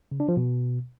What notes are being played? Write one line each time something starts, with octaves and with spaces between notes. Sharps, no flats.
C#3
D4
F3
B2